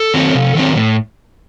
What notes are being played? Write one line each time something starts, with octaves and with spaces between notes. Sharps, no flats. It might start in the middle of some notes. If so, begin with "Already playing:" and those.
Already playing: A4
D#3 F#3 C4
C3
D#3 F#3 C4
A2